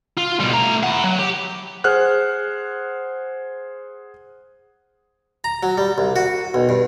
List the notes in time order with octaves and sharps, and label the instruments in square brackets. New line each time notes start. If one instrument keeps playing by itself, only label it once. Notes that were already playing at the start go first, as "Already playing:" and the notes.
[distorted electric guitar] F4
B2 G3
A3 A#5
E4 F#5
F#3
G4
[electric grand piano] G#4 C5 F#5 F6 F#6
[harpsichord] A#5
F#3
G3
C2
F#4
B1
G2